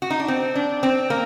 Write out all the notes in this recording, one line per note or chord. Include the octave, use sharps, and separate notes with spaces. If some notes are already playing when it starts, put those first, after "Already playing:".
F#4
D#4
D4
C4
D4
C4
A#3